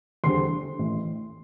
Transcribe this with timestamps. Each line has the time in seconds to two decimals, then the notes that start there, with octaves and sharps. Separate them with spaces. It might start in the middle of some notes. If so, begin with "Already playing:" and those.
0.24 E2 D3 G3 C4 C6
0.79 A1 A2 E3